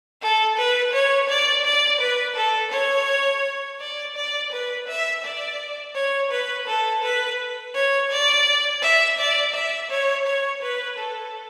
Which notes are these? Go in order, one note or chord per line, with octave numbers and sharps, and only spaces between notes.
A4
B4
C#5
D5
D5
B4
A4
C#5
D5
D5
B4
E5
D5
C#5
B4
A4
B4
C#5
D5
E5
D5
E5
C#5
C#5
B4
A4